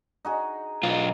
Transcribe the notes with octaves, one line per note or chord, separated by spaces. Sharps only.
D#4 F#4 G#4
B1 F4 D#5